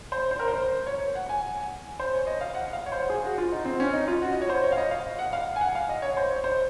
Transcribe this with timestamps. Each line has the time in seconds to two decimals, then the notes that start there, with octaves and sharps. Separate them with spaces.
0.12 C5
0.31 C5
0.39 A#4
0.48 C5
0.87 C#5
1.15 F#5
1.29 G#5
2.00 C5
2.14 C#5
2.27 D#5
2.41 F5
2.55 F#5
2.73 F5
2.86 C#5
2.92 C5
3.10 G#4
3.24 F#4
3.38 F4
3.52 D#4
3.65 C4
3.80 C#4
3.93 D#4
4.08 F4
4.22 F#4
4.33 D#5
4.42 C#5
4.49 C5
4.64 C#5
4.72 F5
4.78 D#5
4.91 F5
5.19 F#5
5.33 F5
5.56 G#5
5.61 F#5
5.75 F5
5.89 D#5
6.02 C#5
6.17 C5
6.31 C#5
6.44 C5